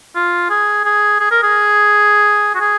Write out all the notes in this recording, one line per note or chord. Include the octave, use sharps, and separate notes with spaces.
F4
G#4
G#4
G#4
A#4
G#4
F#4
G#4